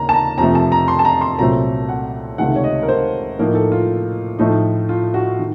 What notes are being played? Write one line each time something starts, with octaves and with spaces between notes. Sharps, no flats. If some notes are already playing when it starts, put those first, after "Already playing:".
Already playing: D#2 C#3 A#3 A#5
A5
A#5
F2 C3 F3 A3 A#5
A5
A#5
C6
A5
A#5
C6
C2 A#2 F#3 A3 C4 A#5
F#5
C#2 C3 D#3 A3 D#4 F#5
C#5
D#5
A#4
C5
A2 F3 A#3 D#4 A#4
A4
F4
A2 F3 A3 D#4
F4
F#4
D#3